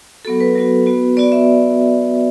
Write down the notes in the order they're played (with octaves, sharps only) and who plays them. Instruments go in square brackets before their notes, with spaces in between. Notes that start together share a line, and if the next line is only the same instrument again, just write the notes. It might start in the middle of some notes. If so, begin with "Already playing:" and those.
[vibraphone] F#3 B3 F#4 A4
B4
F#3 B3 F#4
B3 F#4
B3 F#4 D5
E5